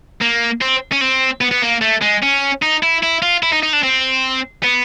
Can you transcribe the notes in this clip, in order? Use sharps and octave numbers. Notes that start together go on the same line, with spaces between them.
A#3
C4
C#4
C4
B3
B3
A#3
A3
G#3
C#4
D#4
E4
E4
F4
E4
D#4
D#4
D4
C4
B3